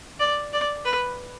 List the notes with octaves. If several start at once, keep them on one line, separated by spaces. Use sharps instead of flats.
D5
D5
B4